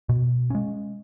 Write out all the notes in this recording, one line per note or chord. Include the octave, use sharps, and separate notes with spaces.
B2
G#3 C#4